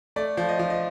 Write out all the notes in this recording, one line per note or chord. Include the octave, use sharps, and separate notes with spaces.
A3 D5
F3
D#5
F3
D#5